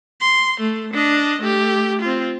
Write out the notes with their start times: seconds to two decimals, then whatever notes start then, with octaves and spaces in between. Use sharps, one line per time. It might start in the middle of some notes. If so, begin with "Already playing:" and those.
0.21 C6
0.60 A3
0.93 D4 D#5
1.41 A3 G4
2.01 C4 F4